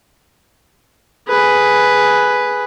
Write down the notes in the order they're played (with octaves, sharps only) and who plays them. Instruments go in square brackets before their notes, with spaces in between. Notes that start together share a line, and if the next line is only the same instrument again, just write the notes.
[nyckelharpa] G#4 B4